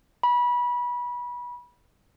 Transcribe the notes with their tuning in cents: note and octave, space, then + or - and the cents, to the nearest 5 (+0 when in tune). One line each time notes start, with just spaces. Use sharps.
B5 -25